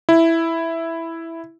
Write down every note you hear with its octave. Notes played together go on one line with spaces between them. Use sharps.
E4